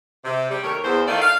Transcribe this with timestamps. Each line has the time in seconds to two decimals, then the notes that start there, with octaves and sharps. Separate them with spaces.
0.25 C3
0.51 G3
0.63 D#2 A3 A#4 C#5
0.84 E2 C5
1.08 D#3 A3 D#4 F4 C5 D5
1.22 F5